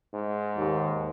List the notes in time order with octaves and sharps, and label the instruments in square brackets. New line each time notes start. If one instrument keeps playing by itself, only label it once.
[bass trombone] G#2
[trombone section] D#2